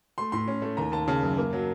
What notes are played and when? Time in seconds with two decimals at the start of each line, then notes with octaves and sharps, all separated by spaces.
0.18 A3 C6
0.32 A2 C6
0.48 C#4
0.62 A3
0.77 D#2 A#5
0.92 D#2 A5
1.08 C#3 A5
1.23 F#2
1.38 A#3
1.53 F#3